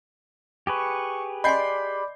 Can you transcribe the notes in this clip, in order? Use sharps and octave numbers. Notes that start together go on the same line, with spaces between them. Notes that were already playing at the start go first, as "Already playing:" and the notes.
G4 G#4 B4 C#6
D5 D#5 G#5 B5 C6 G6 C7